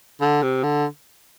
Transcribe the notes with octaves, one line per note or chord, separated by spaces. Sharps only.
D3
C3
D3